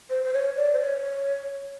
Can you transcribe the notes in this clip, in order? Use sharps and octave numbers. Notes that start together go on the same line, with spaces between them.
C5
C5
C#5
D5
C5
C#5